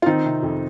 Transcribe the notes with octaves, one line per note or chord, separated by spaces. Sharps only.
F4
D#3 C4 D#4
C3
F2